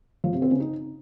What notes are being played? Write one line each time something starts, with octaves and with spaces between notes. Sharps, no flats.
F3
C3
C4
C#3
D#4